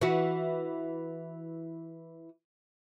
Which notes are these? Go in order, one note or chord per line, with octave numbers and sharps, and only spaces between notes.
E3 F#4